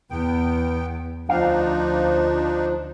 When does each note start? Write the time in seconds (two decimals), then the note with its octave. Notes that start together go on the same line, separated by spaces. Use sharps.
0.11 E2 B3 G5
1.29 D2 F3 D4 D#4 F5